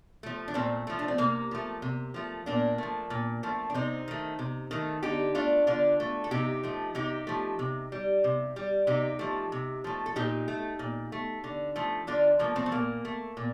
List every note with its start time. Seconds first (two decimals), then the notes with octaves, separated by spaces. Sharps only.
0.23 F3 A3
0.48 D4
0.54 A#2 A3 C4
0.87 F3 A3
0.99 D4
1.08 C4
1.18 C3 A#3
1.51 F3 A3
1.82 C3
2.14 F3 A3
2.46 A#2 A#3 D4
2.78 F3 A3
3.10 A#2
3.43 F3 A3
3.70 D4
3.74 C3 C4 D#4
4.08 D#3 A3
4.39 C3
4.71 D#3 A3
5.03 D3 D#4 G4
5.35 A3 D4 F4
5.67 D3 D4 F4
6.00 A3
6.24 A4
6.31 C3 D#4 G4
6.64 F3 A3
6.95 C3 D#4 G4
7.27 F3 A3
7.59 C3
7.92 G3
8.24 C3
8.56 G3
8.87 C3 D#4 G4
9.19 F3 A3
9.52 C3
9.84 F3 A3
10.06 A4
10.16 A#2 D#4 G4
10.48 A3
10.79 A#2
11.12 A3
11.44 D3
11.76 F3 A3
12.07 D3 D4 F4
12.39 F3 A3 A#3
12.56 A3 C4
12.66 A3
12.72 A#2 A#3
13.05 A3
13.37 A#2